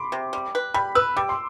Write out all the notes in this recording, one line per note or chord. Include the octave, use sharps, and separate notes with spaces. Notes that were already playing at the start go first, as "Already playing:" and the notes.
Already playing: B5 C6 D6
C3
G3
B4
G3 B5
B4 E6
G3 D6
C6